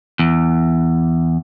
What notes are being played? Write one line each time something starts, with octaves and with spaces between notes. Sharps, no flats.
E2